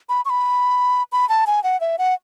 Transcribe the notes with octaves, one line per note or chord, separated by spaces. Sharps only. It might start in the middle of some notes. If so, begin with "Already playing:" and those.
B5
C#6
B5
B5
A5
G#5
F#5
E5
F#5